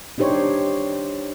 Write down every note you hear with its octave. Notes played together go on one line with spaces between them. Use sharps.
D4 D#4 G4 C5 C#5